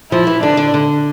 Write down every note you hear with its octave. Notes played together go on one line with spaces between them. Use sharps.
F3 E4
E3
D3 D4
D3
D3